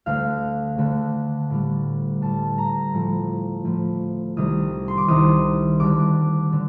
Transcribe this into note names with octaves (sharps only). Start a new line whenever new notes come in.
D2 D3 A3 F5
D2 D3 A3
A2 G3
A2 G3 A5
A#5
A2 F3 A3
A2 F3 A3
C2 C3 D#3 G3 D#6
C6
D6
C2 C3 D#3 G3 D#6
D2 D3 G3 D6
D3